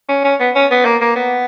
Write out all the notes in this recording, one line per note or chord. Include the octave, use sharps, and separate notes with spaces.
C#4
C#4
B3
C#4
B3
A#3
A#3
B3